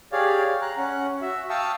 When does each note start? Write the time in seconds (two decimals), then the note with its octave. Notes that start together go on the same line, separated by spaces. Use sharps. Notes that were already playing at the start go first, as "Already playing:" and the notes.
0.12 G4 G#4 C#5 D5 F5
0.62 A#5 F#6
0.78 C#4 F#5
1.22 F#4 E5
1.50 F5 G5 A5 C#6 D#6 E6